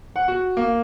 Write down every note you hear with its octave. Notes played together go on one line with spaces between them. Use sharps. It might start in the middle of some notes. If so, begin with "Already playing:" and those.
F#5
F#4
A#3